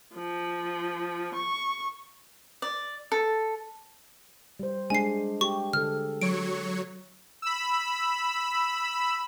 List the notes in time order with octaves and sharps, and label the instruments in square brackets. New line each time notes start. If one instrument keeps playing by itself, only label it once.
[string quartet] F3
C#6
[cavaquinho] D5
A4
[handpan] G3 C5
[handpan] G#3 D4 [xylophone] G#5 C7
[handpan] G4 [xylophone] C#6
[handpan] D3 A4 [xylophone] F6
[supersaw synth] F#3 C#5 C#7 [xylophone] D7
[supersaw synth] B5 E6